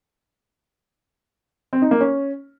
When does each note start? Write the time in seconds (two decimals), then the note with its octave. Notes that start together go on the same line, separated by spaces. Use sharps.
1.73 C4
1.82 D#4
1.91 A#3
2.00 C#4